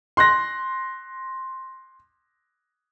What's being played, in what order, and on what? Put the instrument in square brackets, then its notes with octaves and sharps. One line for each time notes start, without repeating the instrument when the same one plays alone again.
[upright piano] C6 F#6 A#6